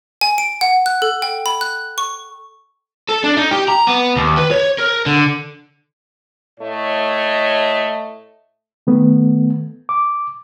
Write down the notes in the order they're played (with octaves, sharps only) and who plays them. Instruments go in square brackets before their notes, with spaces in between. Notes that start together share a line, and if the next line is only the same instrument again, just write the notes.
[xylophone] G#5
D7
F#5
F#6
A4
G5
B5
F#6
C#6
[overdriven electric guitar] A4
D4
D#4
G4
A#5
B3
D#2
B4
C#5
A#4
D3
[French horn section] A2 A3 C#5 D#5
[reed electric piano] D#3 A3 B3
D6